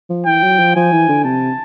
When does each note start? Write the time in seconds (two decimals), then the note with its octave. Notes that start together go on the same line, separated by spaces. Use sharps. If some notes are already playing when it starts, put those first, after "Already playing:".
0.10 F3
0.26 E3 G5
0.42 F#3
0.59 F3
0.76 F3 G#5
0.92 E3
1.08 D3
1.25 C3 A5